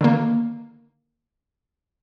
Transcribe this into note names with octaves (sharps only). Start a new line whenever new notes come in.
D3 D#3 A#3